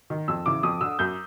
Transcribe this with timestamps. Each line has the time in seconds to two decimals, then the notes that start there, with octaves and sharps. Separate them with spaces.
0.10 D#3
0.28 F2 E6
0.46 C#3 E3 D6
0.63 F2 D#6
0.81 D3 E6
0.99 F#2 G6